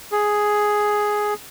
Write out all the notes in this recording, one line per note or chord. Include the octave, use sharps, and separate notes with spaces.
G#4